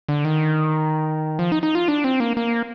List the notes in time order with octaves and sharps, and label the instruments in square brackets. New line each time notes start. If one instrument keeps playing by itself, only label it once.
[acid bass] D3
D#3
F3
D#4
D#4
F4
D4
C4
A#3
A#3